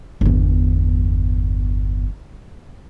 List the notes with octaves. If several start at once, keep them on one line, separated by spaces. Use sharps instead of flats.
G1 E2